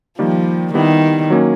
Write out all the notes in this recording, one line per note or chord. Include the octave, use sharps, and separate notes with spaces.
D#3 F3 G3 A#3
D#3 G3 B3 E4 G4
F#3 A#3 C#4